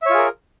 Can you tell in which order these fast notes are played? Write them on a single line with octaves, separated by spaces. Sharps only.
E5 C#5 F4 G#4 A#4